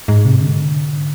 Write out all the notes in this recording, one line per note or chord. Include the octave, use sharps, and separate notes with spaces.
G#2
C3
D3